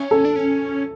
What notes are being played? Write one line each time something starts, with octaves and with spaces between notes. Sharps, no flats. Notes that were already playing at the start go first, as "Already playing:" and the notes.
Already playing: C#4
A4
D4
C#4